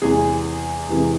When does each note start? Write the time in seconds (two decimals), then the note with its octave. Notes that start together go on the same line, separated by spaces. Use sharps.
0.02 E2 C3 E3 G#3 G#4
0.89 E2 C3 E3 G#3